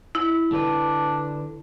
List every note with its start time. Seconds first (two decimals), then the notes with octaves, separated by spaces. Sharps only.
0.15 E4
0.52 D3 D4 B4